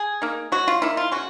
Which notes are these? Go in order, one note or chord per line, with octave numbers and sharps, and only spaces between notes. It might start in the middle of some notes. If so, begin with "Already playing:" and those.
Already playing: G#4
A#3 D#4
F#3 F#4
F4
A#3 D#4 E4
F4
C#3 F#4